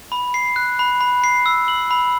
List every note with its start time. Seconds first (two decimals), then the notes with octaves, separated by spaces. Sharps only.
0.12 B5
0.34 C7
0.56 F#6
0.79 B5
1.01 B5
1.24 C7
1.46 E6
1.68 F#7
1.91 B5